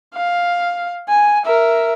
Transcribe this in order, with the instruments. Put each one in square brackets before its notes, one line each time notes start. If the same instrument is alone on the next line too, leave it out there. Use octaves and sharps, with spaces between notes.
[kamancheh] F5
G#5
A#4 E5